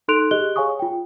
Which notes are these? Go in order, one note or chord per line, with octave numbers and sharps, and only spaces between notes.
D#4 A4 C6 F#6 D7 F7
G4 G#4 D#5 F#6 G7
G#4 C#5 F5 G#5 C#6 D#6
F4 G5